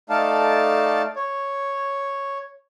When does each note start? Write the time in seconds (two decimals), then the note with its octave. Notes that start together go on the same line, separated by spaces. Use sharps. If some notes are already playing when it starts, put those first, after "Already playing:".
0.10 A3 D#4 A4 D5 F5 A5
1.16 C#5